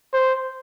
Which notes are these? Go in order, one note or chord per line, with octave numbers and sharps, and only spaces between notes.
C5